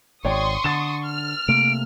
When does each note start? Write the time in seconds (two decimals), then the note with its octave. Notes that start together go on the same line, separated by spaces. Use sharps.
0.25 G#1 C#5 D5 G5 C6 C#6 D#6
0.64 D3 A6 E7
1.04 F6
1.48 C3 A3 A#3 D7